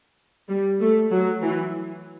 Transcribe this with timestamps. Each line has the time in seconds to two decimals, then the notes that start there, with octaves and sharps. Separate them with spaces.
0.48 G3
0.80 A3
1.11 F#3
1.42 E3